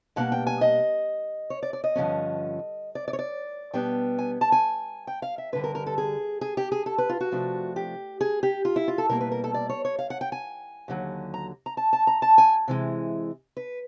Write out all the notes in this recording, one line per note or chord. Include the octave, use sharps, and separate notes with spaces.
B2 G3 A#3 D4 F#5
G5
G#5
D#5
C#5
D5
D5
D#5
G2 D3 F3 A3 C#4
D5
D5
C#5
D5
B2 G3 B3 D4 G5
G#5
A5
G#5
G5
F5
E5
G2 D3 G3 B4
A#4
A#4
A4
G#4
G#4
G4
G#4
A4
B4
F4
F#4
C3 F3 A3 D4
G4
G#4
G4
F4
E4
F4
A4
B2 G3 A#3 A#4
B4
A#4
A4
D5
C#5
C#5
F5
F#5
G5
G#5
D#2 D3 F#3
A#5
A#5
A5
A5
A#5
A5
G#5
C3 E3 G#3
B4